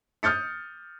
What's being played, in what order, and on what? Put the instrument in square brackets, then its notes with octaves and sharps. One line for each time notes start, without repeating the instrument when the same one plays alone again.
[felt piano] D#6 F6 G6 A6 C#7